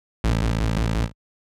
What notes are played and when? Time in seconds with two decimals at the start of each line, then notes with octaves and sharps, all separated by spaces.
0.24 A1